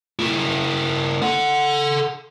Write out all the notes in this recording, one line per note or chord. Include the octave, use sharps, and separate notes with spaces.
A#3 E4
A4 F#5